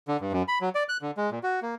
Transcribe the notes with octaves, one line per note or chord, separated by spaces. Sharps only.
D3
G2
F#2
B5
F#3
D5
F#6
D3
G#3
A#2
F#4
A#3